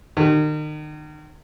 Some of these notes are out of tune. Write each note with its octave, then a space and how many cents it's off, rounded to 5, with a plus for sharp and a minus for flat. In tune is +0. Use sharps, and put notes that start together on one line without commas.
D#3 -35